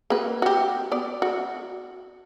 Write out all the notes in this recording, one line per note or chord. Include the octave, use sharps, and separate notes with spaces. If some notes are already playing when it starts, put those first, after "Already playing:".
A#3 F#4 B4
F#4 G4
B3 D5
F#4